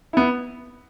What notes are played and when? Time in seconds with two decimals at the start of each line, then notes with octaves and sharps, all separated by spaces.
0.13 B3 E4